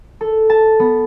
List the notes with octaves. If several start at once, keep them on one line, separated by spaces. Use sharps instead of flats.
A4
A5
B3